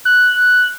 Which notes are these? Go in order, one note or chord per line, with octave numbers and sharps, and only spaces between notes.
F#6